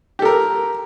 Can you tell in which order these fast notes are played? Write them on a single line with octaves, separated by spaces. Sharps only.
G4 A4 A#4